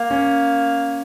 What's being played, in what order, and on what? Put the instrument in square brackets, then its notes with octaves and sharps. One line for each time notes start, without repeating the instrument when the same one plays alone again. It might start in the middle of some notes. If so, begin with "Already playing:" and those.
Already playing: [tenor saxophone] A#3
[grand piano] C#4